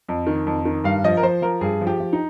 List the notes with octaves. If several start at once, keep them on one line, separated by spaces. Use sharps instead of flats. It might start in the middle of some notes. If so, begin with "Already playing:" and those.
F2
D#3
F2
D#3
G2 F5
F3 D#5
A#4
F3 C5
F3 A#4
G2 G#4
F3
G4
F3
D#4